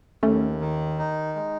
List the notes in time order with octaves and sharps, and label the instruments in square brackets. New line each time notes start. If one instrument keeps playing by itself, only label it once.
[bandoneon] D#2 [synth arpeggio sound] A3 C#4
[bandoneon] D#3
D#4
G#3